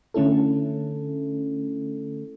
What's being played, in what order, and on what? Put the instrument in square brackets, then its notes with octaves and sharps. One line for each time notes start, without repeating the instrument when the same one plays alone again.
[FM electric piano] D3 A3 C#4 E4 A4